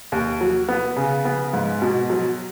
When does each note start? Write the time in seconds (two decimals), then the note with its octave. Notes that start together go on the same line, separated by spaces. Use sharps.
0.12 D#2
0.41 F#3
0.69 B3
0.96 C#3
1.25 B3
1.53 G#2
1.82 B2
2.10 F#3